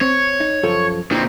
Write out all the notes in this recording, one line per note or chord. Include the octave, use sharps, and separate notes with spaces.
C4 C#5
D#4
F#2 F3 A4
A#2 C4 D4 E4 D#5